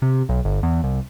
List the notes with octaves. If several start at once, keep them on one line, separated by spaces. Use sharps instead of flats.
C3
B1
G1
E2
C2